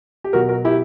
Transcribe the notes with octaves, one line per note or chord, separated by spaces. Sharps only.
G4
B2 F#3 F#4 A#4
F#4 A#4
E4 G4